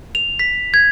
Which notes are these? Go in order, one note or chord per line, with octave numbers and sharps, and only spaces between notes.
F7
B6
G#6